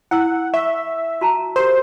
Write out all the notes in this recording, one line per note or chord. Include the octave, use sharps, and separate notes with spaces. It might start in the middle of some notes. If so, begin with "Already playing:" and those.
E4 F#5 G5 E6
E5 C#6
F#4 A5 A#5
G4 A#4 C5